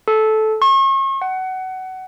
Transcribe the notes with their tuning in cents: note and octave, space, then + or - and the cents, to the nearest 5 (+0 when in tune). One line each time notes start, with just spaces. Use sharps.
A4 -15
C#6 -40
F#5 +20